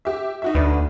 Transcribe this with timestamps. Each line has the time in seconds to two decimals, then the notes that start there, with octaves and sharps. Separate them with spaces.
0.05 G4 E5
0.42 D#4 F#4 E5
0.55 D2 D4 B4